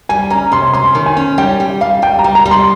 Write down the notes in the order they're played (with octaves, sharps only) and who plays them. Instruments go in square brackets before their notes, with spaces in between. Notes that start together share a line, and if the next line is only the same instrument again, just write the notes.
[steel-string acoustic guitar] G3 [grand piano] G#5
[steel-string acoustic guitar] C#4 [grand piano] A#5
[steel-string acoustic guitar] C3 [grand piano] C6
[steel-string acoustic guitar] C#4 [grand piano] C6
[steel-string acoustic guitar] D#3
[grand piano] G#5
[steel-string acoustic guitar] C#4
[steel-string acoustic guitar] G3 [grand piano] G5
[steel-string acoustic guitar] G3
[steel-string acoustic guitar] G3 [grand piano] F5
[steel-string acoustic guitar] G3 [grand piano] G5
[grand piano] A#5
[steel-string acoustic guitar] G3
[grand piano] A#5
[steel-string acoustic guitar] G3
[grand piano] C6